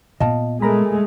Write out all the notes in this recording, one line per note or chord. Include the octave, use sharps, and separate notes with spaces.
A#2 B3 D#5 F5 A5
G#3 A3 A#4 A#5 B5